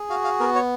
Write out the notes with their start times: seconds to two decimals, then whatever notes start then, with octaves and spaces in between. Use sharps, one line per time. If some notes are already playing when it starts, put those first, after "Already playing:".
Already playing: G#4
0.10 F#4 F5
0.24 F5
0.40 B3 A#4
0.55 C#5